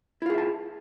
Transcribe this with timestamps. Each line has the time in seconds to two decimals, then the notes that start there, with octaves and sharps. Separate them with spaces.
0.22 E4
0.26 F4
0.30 G#4
0.34 E5
0.38 A5